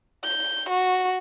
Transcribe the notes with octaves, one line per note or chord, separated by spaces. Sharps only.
G6
F#4